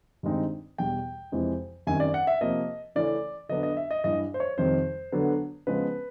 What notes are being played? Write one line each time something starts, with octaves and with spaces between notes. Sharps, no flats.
G2 D#3 G#3 C4 D#4
E2 B2 G3 G5
F2 C3 E3 G#3
F#2 D#3 G3 C4 G#5
D5
F#5
E5
C3 F3 A#3 D#5
C#3 E3 A3 C#4 D5
D3 F#3 B3 D4 D#5
D#5
E5
D#5
G2 E3 G3 D#5
C5
C#5
F2 C3 D#3 G3 C5
D3 F#3 B3 D4
C#3 F3 G#3 B3 B4